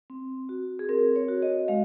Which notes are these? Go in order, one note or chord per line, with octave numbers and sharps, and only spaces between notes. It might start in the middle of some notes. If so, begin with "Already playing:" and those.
C4
F#4
G#4
C4 A#4
C#5
F#4
D#5
G#3 F5